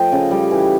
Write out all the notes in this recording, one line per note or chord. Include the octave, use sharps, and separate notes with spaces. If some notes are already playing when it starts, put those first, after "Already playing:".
Already playing: F3 A3 D#5 G5
C#3
G3
E3